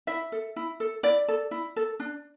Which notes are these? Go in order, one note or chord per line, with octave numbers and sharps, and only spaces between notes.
E4 E5
A4
E4
A4
E4 D5
A4
E4
A4
D4